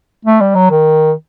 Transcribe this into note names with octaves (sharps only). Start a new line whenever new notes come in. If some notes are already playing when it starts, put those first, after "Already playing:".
A3
G3
F#3
D#3